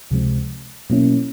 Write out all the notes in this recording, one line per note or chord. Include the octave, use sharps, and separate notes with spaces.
C#2 C3 F3 G#3 C4
B2 F#3 A#3 C#4 E4